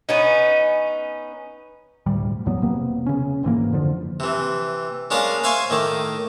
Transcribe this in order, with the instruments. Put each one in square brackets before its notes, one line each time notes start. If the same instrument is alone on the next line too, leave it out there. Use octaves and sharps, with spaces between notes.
[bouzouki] B3 C#4 D#4
[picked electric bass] E1 D2 A2 G3
A1 E2 F#3 B3
E1 C3 A#3 B3
C#3 C#4
G1 G#2 E3 A#3
F2 D3 F3
[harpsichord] C3 E3
G#3 C#4 D4 A#4 F5
C5 E5 F5 G#5 C6 C#6
A2 D#3 D6